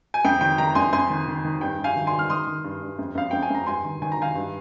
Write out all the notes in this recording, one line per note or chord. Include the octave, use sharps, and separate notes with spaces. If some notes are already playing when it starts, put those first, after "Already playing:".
G#5
F2 G5
D#3 G5
D#3 G5 A#5
F2 G#5 C6
F2 G#5 C6
D#3
D#3
D#3
G2 G5
G2
F5 G#5
D#3
G#5 C6
D#3
F6
D#3 C6 D#6
D#3
G2
G2
F2
F2 F5
F2 G5
G#5
F2 A#5
G2 G#5 C6
D#3
D#3 G#5
A#5
D#3 F5 G#5
G2